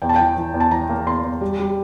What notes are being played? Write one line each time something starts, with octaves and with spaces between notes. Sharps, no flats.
E2 G5
A5
E3 G5
E3
E2
A5
E3 A#5
A#3
E2 C6
E2
G3
G3